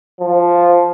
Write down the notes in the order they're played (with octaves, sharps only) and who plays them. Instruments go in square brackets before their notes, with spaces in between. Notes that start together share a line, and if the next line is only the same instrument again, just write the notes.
[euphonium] F3